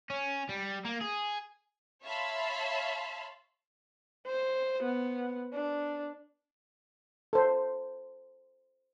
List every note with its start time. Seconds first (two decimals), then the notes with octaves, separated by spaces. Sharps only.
0.10 C#4
0.49 G3
0.85 A#3
1.01 G#4
2.04 C#5 E5 F5 A5 B5 C6
4.27 C5
4.83 B3
5.53 D4
7.33 A4 C5